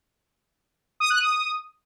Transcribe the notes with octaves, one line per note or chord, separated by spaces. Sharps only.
D#6
F#6
D#6